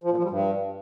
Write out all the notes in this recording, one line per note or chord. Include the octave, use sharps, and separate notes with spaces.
F3
A#2
F3
G3
G2